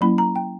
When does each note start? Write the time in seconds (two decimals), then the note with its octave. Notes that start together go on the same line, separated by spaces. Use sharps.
0.01 F#3 A#3 C#4 E4 B5
0.18 A#5
0.36 G5